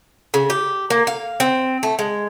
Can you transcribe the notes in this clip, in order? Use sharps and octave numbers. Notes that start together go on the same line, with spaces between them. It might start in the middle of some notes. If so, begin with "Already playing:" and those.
C#3
G4
A#3
F5
C4
A3
G#3